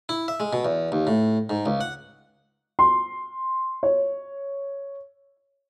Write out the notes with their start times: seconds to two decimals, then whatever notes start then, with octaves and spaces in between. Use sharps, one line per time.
0.09 E4
0.28 E5
0.40 G#3
0.53 B2
0.65 E2
0.92 D#2
1.07 A2
1.50 G#2
1.66 C#2
1.81 F#5
2.79 C6
3.83 C#5